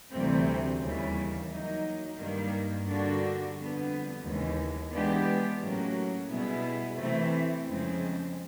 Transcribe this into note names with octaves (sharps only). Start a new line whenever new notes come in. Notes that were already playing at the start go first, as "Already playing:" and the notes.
D2 C3 E3 G3 C4
D#2 C#3 E3 G3 A#3
F#3 A#3 D#4
G2 D#3 G3 A#3
D3 G3 A#3 D4 F#4
F2 D3 G3 B3
D#2 C#3 E3 G#3
E3 G#3 B3 D4 G4
A2 F#3 A#3 C#4 F#4
B2 G3 B3 E4 G#4
C3 E3 A3 C4 E4
F2 C#3 F3 G#3 C4